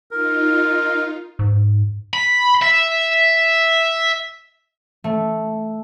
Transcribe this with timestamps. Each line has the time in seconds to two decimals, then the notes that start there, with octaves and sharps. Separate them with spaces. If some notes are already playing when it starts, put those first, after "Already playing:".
0.11 D#4 F4 A#4
1.39 G#2
2.14 B5
2.62 E5
5.04 A3